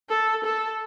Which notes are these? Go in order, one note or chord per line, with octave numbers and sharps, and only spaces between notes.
A4
A4